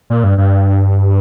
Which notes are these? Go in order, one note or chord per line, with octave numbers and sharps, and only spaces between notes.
A#2
G2
G2